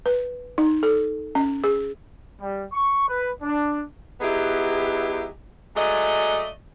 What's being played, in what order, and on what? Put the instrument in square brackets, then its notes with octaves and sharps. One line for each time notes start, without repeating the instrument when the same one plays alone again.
[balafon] B4
D#4
A4
C#4
G#4
[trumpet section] G3
C#6
B4
D4
[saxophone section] F#3 B3 D#4 E4 G4 G#4
F#3 G#3 A3 D5 D#5